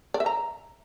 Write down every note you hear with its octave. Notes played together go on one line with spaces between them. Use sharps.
D5
E5
A#5